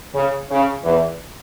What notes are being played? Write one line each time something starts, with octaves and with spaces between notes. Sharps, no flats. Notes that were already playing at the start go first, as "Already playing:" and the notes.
C#3
C#3
E2 E3